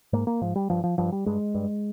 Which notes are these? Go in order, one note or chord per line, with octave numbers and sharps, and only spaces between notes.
G#2 A#3
A#3
G#2 F3
G3
G2 F3
F3
G2 F3
G3
G2 G#3
G2